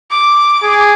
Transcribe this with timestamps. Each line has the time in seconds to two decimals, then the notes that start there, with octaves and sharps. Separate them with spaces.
0.11 D6
0.63 G#4